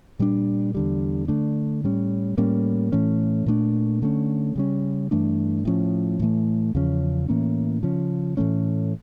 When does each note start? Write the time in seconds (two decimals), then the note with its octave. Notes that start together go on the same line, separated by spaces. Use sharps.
0.19 A#2 G3 D4
0.75 E2 D3 G3
1.28 D3 A3 D4
1.84 A2 G3 C#4
2.38 A2 G3 A#3 C#4
2.92 A2 E3 A3 C#4
3.46 A#2 A3 D4
4.02 D3 A3 C#4
4.56 C#3 G3 C#4
5.11 G2 E3 A3 D4
5.65 A2 F3 C#4
6.19 A2 E3 A3
6.75 E2 C#3 F3 C#4
7.28 A2 E3 A#3 C#4
7.83 C#3 F3 C#4
8.37 A2 E3 A3 C#4